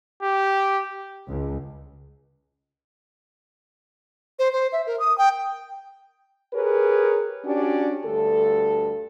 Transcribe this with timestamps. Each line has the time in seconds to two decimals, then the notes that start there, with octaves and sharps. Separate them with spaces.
0.23 G4
1.26 C#2
4.39 C5
4.53 C5
4.72 E5
4.87 A#4
5.00 D#6
5.18 G5
6.54 G4 G#4 A#4 B4 C#5
7.45 C#4 D4 F#4 G4 D5
8.04 D2 G2 A4